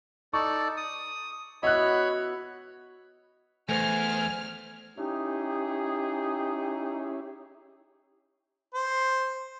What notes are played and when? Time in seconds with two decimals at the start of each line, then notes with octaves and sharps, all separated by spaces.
0.33 D#4 A4 D5 C#6
0.77 D#6
1.63 B3 E4 F#4 C#5 D#5 B5 F#6
3.69 E2 A3 C5 G#5 F6
4.98 C#4 D#4 E4 G4 G#4
8.75 C5